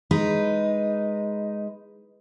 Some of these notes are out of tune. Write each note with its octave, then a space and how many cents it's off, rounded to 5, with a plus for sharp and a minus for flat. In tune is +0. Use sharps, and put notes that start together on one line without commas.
G#3 +0 D#4 +0 B4 +0